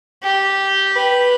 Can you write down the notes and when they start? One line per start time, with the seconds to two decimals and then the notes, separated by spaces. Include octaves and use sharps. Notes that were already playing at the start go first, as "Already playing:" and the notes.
0.24 G4
0.96 B4